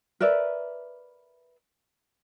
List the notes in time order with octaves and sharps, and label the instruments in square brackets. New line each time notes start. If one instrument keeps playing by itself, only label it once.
[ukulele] A#4 B4 D5 E5